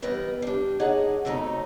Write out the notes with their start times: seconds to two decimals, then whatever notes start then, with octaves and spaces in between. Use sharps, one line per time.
0.02 E3 G3 B3 D#4 A#4 B4
0.42 G3 D4
0.80 A#3 D4 D#4 G#4 C#5 F#5
1.25 F2 F#3 A3 D#4 C#5